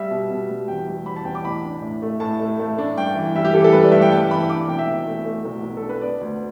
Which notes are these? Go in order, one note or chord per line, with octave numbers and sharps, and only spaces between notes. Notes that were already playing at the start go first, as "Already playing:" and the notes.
Already playing: G3 E5
B2
B2
G3
E2 G5
G3
E2 B5
A5
E2 G5
D6
A1 B5
D4
A2
A3
A2 A5
A3
A3
D4
G2 G5
E3
G3 E5
G4
E3 A4
A4
G3 B4
D5
G2 E5
G5
G2 A5
E3 B5
D4 D6
B1 G5
E5
B1
A3
A3
B1
B1
A4
D4
B4
B3 D5
D2